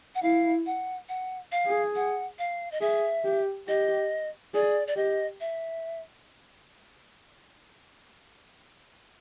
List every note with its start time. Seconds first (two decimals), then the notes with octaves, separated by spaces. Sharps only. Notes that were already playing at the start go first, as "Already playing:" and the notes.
0.15 F#5
0.22 E4 F5
0.66 F#5
1.09 F#5
1.52 F5
1.67 G#4
1.96 F#5
2.39 F5
2.72 D#5
2.81 G#4 E5
3.24 G4
3.67 G4 D#5
4.54 G#4 D5
4.87 D5
4.96 G4 D#5
5.40 E5